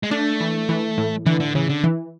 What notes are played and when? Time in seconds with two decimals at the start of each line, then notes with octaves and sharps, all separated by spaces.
0.03 G#3
0.11 A3 D4
0.40 E3
0.69 E3
0.98 A2
1.26 D3 E3
1.40 D3
1.55 C#3 E3
1.69 D3
1.84 E3